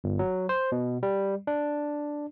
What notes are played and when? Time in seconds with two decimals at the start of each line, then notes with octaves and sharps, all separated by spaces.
0.04 G1
0.19 F#3
0.49 C5
0.72 B2
1.03 G3
1.47 D4